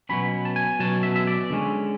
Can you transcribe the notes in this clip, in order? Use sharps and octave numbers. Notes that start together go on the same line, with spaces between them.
B2 F#3 C#4 B5
A5
G#5
B2 F#3 C#4 A5
E5
E5
D5
D3 G#3 C#4